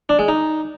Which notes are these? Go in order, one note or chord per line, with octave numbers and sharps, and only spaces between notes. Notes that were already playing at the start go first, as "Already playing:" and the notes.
D4
G#3
D#4